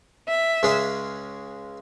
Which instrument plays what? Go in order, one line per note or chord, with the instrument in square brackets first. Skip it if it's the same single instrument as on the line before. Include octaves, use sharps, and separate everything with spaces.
[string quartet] E5
[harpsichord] C#2 C#3 G#3 C#4 G#4